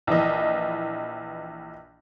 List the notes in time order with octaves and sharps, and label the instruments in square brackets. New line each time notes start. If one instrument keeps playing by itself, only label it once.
[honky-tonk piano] A#1 E3 D#5